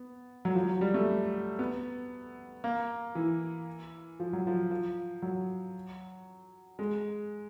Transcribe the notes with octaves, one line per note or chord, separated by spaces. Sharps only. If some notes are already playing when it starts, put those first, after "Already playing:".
Already playing: B3
F#3
F3
F#3
F3
G3
A3
B3
A#3
E3
F3
F#3
F3
F3
F#3
G#3